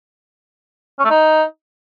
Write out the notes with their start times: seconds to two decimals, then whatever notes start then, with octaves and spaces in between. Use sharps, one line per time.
0.99 C#4
1.05 A3
1.10 D#4